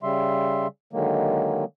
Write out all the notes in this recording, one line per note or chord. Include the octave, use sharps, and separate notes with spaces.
C#3 G3 E5 C6
D3 D#3 F#3 G#3 A#3